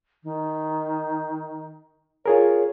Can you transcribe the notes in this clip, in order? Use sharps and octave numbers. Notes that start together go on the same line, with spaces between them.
D#3
F4 G#4 A#4 C#5